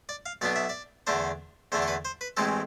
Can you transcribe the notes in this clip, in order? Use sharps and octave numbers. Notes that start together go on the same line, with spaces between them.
D5
F5
B1 B2 B3 D4 D5
E5
D5
E2 D3 A3 D4 C5
E2 D3 A3 D4 C5
A4
B4
C5
B4
A1 A2 E3 G#3 C4 A4